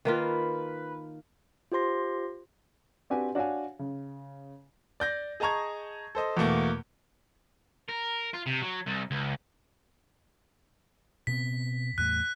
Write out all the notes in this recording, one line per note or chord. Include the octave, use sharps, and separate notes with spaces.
D#3 A#3 F4 B4
F4 G4 C5 C6 A#6
C4 D4 F#4 G4 B4 G#5
D4 F#4 C#5 F5 G#5
C#3
D5 G6 A#6
G#4 D#5 A5 A#5 C#6 G#6
A4 C5 D#5
E2 B2 A3 A#3
A#4
F4
C3
F#3
C2
C#2
B2 B3 C4 B6
E2 A2 F#6